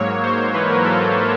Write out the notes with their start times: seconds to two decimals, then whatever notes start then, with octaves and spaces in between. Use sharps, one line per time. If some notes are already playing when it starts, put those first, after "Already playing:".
Already playing: G#2 F#3 A#3 C#5
0.24 G#2 C5
0.54 E3 B4
0.70 A#4
0.85 A4